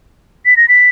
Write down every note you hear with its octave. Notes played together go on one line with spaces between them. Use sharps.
B6
A#6
B6